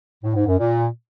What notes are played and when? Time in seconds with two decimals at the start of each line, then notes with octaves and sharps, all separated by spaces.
0.23 A2
0.35 G#2
0.47 F#2
0.58 A#2